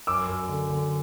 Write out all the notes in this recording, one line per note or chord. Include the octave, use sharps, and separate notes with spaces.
F#2 D6 E6
F#2
D3
D3